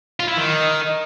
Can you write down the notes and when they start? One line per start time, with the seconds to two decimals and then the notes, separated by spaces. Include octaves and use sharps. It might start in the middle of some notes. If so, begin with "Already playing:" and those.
0.20 F4
0.28 E4
0.37 D#3